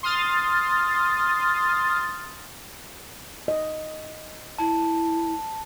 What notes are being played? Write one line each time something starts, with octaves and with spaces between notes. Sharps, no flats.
C6 D#6 F6 A6
D#5
E4 A5